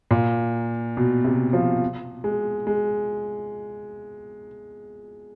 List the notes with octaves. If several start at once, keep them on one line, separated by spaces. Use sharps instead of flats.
A#2
B2
C3
F3
G#3
G#3